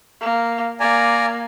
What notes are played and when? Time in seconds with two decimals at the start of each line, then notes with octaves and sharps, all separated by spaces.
0.21 A#3
0.80 A#3 D5 G#5 A#5